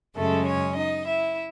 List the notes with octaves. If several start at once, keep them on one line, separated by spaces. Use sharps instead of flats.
F#2 C#3 G#3 A3 A4
C#4 C#5
D#4 D#5
E4 E5